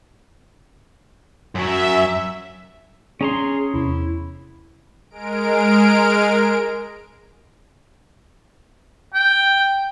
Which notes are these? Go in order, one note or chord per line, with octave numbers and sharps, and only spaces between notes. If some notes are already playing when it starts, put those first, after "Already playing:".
F#2 F#3 E5
C#4 G#4 A#5 C6
E2 C3 E4
G#3 A#4 D7
G5